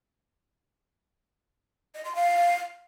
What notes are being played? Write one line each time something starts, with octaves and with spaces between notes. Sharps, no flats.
D#5
C6
F5